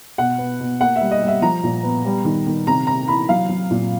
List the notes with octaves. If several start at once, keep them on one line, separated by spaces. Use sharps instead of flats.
B2 F#5
B3
B2
A#3 F#5
E5
G3
D#5
G3
E5
F3 A#5
A#2
B3
G3
D#3
D#3
C3 A#5
C3 A#5
E3 B5
F#3 F5
F#3
A#2